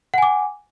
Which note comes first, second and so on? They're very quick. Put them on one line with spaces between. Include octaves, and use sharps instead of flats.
F#5 G#5 D6